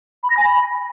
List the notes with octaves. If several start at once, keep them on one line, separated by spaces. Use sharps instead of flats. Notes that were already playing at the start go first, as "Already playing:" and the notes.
B5
A#6
G#5
B5